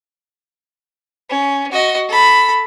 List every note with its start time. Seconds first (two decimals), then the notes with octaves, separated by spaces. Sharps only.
1.30 C#4
1.72 F#4 D#5
2.09 A4 B5